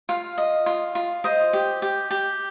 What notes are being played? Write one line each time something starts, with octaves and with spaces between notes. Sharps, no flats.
F4 F5
D#5
F4
F4
C5 D#5
G4
G4
G4